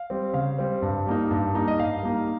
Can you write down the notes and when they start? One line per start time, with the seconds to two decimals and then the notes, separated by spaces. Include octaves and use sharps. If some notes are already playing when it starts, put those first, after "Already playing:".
Already playing: F5
0.10 G3 C4
0.34 C#3 F5
0.58 G3 C4
0.82 G2
1.07 G3 A#3 D#4
1.31 G2
1.55 G3 A#3 D#4
1.68 D#5
1.79 G2 F5
2.03 G3 A#3 D#4